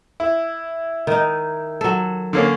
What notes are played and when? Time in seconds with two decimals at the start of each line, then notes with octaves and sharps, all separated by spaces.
0.20 E4
1.07 D#3 D#4
1.81 F#3 A4
2.33 D3 A#3 C#4